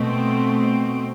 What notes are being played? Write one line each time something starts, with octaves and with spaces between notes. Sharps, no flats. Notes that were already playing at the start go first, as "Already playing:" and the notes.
Already playing: B2 A3 C4